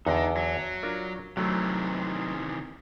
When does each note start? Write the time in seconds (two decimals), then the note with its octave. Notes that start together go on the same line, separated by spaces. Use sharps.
0.06 E2 D3 D#4 F#4 D#5 G5
0.37 F#3
0.83 D4 F4 A#4
1.37 C3 D#3 E3 F#3 A3